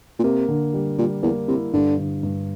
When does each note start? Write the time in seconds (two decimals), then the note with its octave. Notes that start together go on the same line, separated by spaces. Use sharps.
0.19 A#2
0.23 C3 A#3
0.48 D3
0.73 G3
0.98 A#2 G3
1.23 E2 A#3
1.48 C3 E4
1.73 G2 D3
1.98 D3
2.23 G2